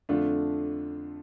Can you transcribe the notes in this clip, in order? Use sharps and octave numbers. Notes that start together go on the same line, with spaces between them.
F2 D3 A3 D4 F4